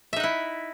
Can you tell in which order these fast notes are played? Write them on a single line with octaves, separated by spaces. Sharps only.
E5 D#4 F#5 E4